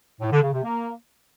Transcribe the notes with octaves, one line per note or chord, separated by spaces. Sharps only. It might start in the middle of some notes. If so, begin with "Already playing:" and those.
A2
D3
C#3
C3
A#3